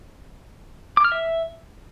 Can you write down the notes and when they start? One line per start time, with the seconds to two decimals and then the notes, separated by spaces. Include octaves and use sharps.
0.97 D6
1.04 F6
1.12 E5